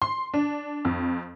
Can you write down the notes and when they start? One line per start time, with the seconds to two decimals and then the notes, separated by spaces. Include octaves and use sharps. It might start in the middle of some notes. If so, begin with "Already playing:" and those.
0.02 C6
0.34 D4
0.85 F2